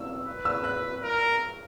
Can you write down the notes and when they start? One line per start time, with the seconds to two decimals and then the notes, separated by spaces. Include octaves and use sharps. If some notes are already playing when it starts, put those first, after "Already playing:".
Already playing: E6
0.27 B4
0.45 E6
0.64 F#6
1.03 A#4